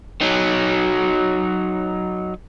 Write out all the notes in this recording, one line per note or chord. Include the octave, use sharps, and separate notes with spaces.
F#3 D#4